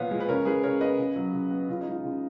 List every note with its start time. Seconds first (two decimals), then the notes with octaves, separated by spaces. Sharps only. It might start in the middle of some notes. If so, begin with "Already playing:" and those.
Already playing: A#2 F3 B3 C#5 F5
0.11 G#3
0.20 B4
0.28 C#3 A#4 C#5
0.45 G#3 G#4 B4
0.63 C#3 A#4 C#5
0.80 B3 B4 D#5
0.98 C#3
1.16 F#3
1.33 C#3
1.51 B3
1.68 C#3 F4
1.81 D#4
1.87 G#3 F4
2.04 C#3 F4